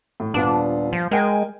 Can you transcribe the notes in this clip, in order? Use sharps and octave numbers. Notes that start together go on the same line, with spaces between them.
A2
D#1 B3 D4 F4
F3
G#3 A#4 G5 G#5